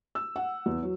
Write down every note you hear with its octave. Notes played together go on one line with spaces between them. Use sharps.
E6
F#5
E2
F#3